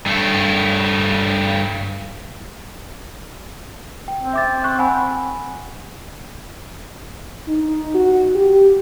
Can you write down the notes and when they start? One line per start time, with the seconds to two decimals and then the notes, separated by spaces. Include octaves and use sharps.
0.06 G2 A3
4.08 G5
4.20 C4
4.33 E5 D6 A6
4.64 C#6 F#6
4.79 F#5 G#5 B5
7.48 D#4
7.94 F#4
8.35 G4